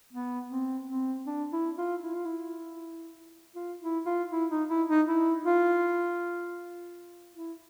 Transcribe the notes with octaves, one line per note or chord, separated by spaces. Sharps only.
B3
C4
C4
D4
E4
F4
E4
F4
E4
F4
E4
F4
E4
D#4
E4
D#4
E4
F4
E4